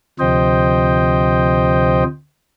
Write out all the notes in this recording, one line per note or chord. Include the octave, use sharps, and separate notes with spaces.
D2 C3 F3 C5 D#5 G5